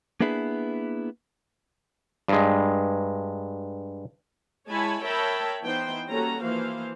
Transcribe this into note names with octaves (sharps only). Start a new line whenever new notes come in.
A#3 B3 D4 E4 G#4 B4
G2 G#3
G#3 E4 C#5 G#5 A5 B5
A#4 C#5 E5 G5 A5 B5
E3 B3 D#4 C5 G5
G3 A#3 C#4 F#4 A4 A#5
E3 F3 A#3 C5 F5